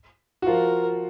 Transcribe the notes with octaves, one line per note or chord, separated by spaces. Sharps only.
F#4
F3 F4 A#4